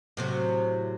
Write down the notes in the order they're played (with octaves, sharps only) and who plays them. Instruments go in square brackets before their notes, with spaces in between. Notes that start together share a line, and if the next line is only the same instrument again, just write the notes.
[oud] A2 C3 F#3